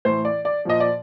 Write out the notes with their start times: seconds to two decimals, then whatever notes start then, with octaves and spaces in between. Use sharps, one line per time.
0.05 A2 E3 C5
0.25 D5
0.45 D5
0.65 A#2 F3 D#5
0.80 D5